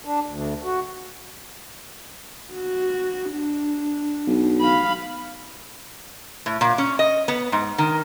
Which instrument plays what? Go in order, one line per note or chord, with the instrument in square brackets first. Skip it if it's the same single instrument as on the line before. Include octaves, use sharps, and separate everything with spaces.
[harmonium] D4
D2
F#4
[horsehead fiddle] F#4
D4
[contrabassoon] B1
[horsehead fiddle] F5 B5
[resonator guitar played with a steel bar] A2
A#2
C#4
D#5
B3
G#2
D#3